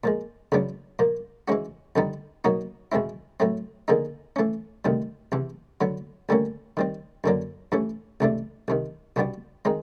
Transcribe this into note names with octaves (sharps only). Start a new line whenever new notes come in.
A#2 F3 G#3
E2 C#3 F#3 B3 D4
A#2 F3 A#3
E3 G#3 C#4 F#4
F2 D3 G3 B3 D#4
B2 F#3 A#3 D#4 F#4
E2 B2 G#3 C4 E4
A2 F#3 A3 C4
D3 F3 A#3 D#4 G#4
E3 A3 C#4
D2 C3 D#3 G3
E2 C3 E3
D3 F#3 B3
D2 D3 G3 A#3 C#4
D#3 G3 C4
F#2 D3 F#3 A#3 D4
G2 E3 A3 C#4
C#2 C3 E3 A3 D4
C2 C3 D#3
C2 B2 G3 B3 D4
D#3 G#3 C4 D#4